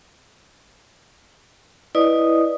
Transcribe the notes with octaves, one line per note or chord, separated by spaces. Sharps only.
E4 B4 D5 D#5 D#6